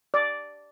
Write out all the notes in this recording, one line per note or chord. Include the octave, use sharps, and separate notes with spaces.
D5